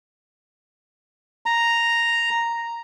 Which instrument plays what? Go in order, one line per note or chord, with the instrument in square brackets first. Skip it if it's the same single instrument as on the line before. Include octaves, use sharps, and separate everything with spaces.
[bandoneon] A#5